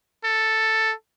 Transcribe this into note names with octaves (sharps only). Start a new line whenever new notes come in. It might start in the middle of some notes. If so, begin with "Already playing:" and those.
A4